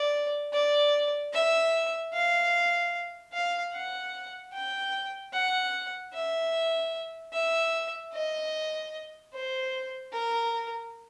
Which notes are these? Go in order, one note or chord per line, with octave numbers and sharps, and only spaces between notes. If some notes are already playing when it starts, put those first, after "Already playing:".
Already playing: D5
D5
E5
F5
F5
F#5
G5
F#5
E5
E5
D#5
C5
A#4